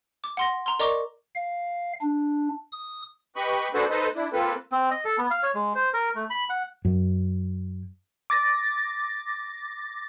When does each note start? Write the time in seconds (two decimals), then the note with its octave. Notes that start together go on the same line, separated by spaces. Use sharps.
0.24 D6
0.37 F#5 C6 A#6
0.66 A#5 C6
0.79 A#4 D5 D#5 A#5 C#6 D6
1.35 F5
2.01 D4
2.72 D#6
3.36 G4 B4 D#5 B5 C#6
3.74 D4 F#4 G#4 A4 B4 C5
3.90 D#4 A4 B4 C5 D#5
4.15 D4 E4
4.33 A#3 C4 F4 A4 B4
4.72 C4
4.91 D#5
5.05 A4
5.18 B3
5.31 F5
5.43 C#5
5.55 G#3
5.75 C5
5.94 A#4
6.15 A3
6.30 B5
6.50 F#5
6.85 F#2
8.30 D6 A6 A#6